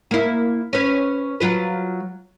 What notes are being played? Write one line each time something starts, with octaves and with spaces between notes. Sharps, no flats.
A#3 E4
C#4 B4
F#3 F4 B4